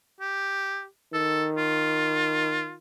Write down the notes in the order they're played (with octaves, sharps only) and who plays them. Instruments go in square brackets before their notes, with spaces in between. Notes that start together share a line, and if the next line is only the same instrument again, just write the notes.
[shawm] G4
[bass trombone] D#3 [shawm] A4
[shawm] F4